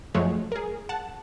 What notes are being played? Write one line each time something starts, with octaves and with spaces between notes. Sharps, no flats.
F#2 F3 F#3 G#3 A3 C#5
G#4 A#4
F#5 A5